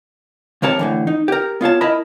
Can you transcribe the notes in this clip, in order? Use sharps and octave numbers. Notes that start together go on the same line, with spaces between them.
D#2 C3 A#4 C#5 A5
A2 D3 E3
D#4
G4 A#4
B3 F4 C#5 A5
E4 A#4 D#5 A5 B5